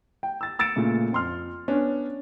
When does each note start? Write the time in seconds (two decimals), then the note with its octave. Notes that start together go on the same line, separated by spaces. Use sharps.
0.23 G5
0.41 E6 A6
0.59 E6 A6 C#7 D7 E7
0.76 A#2 C#3 A3
1.13 F2 C6 F6
1.68 B3 C#4 D4